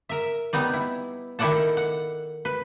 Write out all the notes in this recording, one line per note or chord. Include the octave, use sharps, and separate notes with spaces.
A#4 E5
G3 B3 D#4 D5
E4
D#3 E4 A4 D5 F#5 A5
F#5
B4